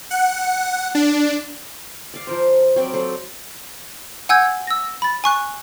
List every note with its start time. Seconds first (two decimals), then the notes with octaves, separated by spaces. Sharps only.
0.11 F#5
0.95 D4
2.14 D5 F5
2.27 F3 A#4 C5
2.76 F#3 C4 A#4 D5
2.93 F#3 A4 C5 D5
4.29 F#5 G#5 E6 G6 G#6
4.67 E6 A#6
5.02 B5 A6
5.24 G#5 C#6 F#6